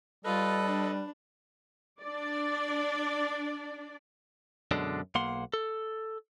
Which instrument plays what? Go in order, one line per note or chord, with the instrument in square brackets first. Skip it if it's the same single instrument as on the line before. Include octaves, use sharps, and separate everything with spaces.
[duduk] G3 [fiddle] F4 [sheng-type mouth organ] A4 D#5 [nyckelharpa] B4
[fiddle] D4
[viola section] D4 D5
[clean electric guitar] F#2 B2 D3 G#3 D4
B1 A#3 F#5 C6
A4